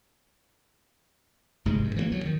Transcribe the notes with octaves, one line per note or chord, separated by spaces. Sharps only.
F1 G#2 C3 G#3
F#2
E3 F#3 A#3
D2 F#3
D#3